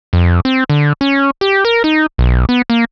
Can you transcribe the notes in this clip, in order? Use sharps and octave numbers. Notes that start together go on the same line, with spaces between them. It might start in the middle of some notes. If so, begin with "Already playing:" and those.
F2
C4
D3
C#4
G4
A#4
D#4
B1
B3
A#3